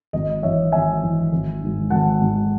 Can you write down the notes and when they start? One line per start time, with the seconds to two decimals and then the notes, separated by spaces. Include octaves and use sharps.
0.13 G#1 D#5
0.42 F#2 E3 C#5 E5
0.72 G#1 E5 G#5
1.02 F#2 E3
1.32 G#1
1.61 G#2 D#3 F#3
1.90 G#1 F#5 A5
2.20 G#2 D#3 F#3